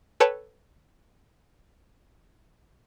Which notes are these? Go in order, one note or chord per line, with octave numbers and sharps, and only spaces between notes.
A4 B4 C#5 G5 A5